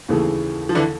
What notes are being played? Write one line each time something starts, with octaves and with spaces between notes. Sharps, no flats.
D#2 C#3 E3 A3
F3
D3 E3